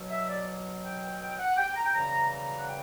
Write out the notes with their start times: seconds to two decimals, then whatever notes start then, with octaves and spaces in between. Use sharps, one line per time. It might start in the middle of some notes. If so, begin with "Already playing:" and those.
Already playing: B2 F#3
0.10 E5
0.28 D5
0.83 G5
1.21 G5
1.39 F#5
1.57 G5
1.71 G5
1.75 A#5
1.85 G5
1.93 F#2 C#3 E3 G3 A#5
2.31 A#5
2.57 F#5
2.67 G5